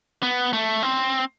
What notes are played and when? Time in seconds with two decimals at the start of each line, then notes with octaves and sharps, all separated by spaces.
0.23 B3
0.53 A3
0.83 C4